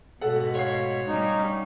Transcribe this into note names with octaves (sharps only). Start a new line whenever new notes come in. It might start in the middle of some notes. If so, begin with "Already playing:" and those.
G#2 B2 A4 F#5
C#5 F5 F#5 C7
G3 C#4 D#4